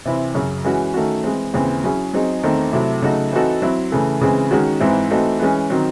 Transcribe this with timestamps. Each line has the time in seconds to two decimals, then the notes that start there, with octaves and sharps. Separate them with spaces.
0.05 C3 E3 C4 E4
0.35 F#2 C#3 F#3 C#4
0.65 E3 G#3 C#4 F#4
0.94 D#3 A3 C#4 F#4
1.24 E3 G#3 C4
1.53 D#2 C#3 E3 C4
1.83 F#3 C#4 E4 G#4
2.13 F#3 C4 D#4 G#4
2.43 E2 D#3 A3 C4
2.73 C3 F#3 A3 C4 E4
3.02 C#3 F#3 A3 D#4 F#4
3.32 E3 C4 D#4 F#4 A4
3.62 F#3 C4 E4
3.92 C#3 E3 A3
4.21 C#3 E3 G#3 C4
4.51 D#3 G#3 C#4 F#4
4.80 G#2 E3 C4 E4
5.11 E3 A3 C4 D#4 F#4
5.40 E3 G#3 C#4
5.70 D#3 F#3 C4